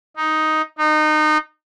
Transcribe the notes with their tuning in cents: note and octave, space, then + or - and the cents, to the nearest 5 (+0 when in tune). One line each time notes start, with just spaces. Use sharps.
D#4 +5
D#4 -25